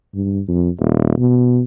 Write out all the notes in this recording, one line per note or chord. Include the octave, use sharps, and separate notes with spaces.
G2
F2
D#1
B2